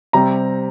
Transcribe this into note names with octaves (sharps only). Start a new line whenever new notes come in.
C3 G3 C4 A#5